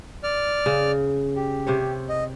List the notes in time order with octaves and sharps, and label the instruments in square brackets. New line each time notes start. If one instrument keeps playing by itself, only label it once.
[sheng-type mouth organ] D5 F6
[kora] C#3
[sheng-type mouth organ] G4
[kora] C3 C5 C#5
[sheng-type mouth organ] D#5